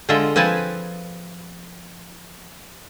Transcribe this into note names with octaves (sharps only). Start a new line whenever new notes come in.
D3 G#3 F4 D#5 E5 A#5
F3 C4 B4 G#5 A5